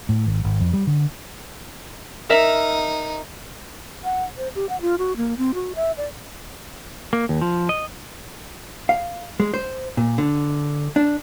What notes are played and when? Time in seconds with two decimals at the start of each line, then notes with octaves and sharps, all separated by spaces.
0.09 A2
0.26 G#1
0.44 G#1
0.61 F2
0.73 G3
0.87 D3
2.30 D#4 A#4 E5
4.04 F#5
4.37 C5
4.55 G4
4.69 F#5
4.81 F4
4.98 F#4
5.17 A#3
5.38 C4
5.54 F#4
5.75 E5
5.97 D5
7.13 A#3
7.29 D#2
7.41 F3
7.69 D#5
8.89 F5
9.40 G#3
9.54 C5
9.97 A#2
10.18 D3
10.96 D4